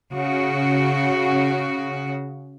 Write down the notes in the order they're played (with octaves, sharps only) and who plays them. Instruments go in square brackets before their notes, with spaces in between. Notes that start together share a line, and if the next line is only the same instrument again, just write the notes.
[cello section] C#3 F#4